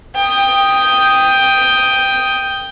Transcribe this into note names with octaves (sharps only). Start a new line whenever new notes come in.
G5 D#6